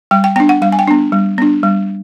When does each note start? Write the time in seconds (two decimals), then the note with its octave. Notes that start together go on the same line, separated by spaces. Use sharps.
0.11 G3 G5
0.24 G5
0.36 B3 D4 G5
0.49 F#5
0.62 G3 F5
0.72 G#5
0.79 G5
0.88 B3 D4
1.12 G3
1.38 B3 D4
1.63 G3